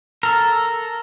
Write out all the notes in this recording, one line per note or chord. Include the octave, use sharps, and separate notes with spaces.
A4 A#4